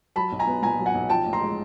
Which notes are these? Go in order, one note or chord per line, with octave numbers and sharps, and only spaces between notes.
F#3 A5 B5
B1
G#5 A#5
B3
A#2 G#5 A#5
F#3
F#5 G#5
B1
F3 G5 A5
A1
A#5 C6
G#3